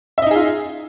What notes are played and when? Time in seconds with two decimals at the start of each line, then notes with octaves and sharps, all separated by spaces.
0.18 E5
0.22 D#5
0.27 D#4
0.31 G#4
0.35 F4